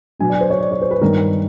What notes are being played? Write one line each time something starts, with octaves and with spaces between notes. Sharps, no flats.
B2 F#3 B3 D4 G#5
D5
C5
C#5
D5
C#5
C5
B4
G2 D#3 G3 B3 A#4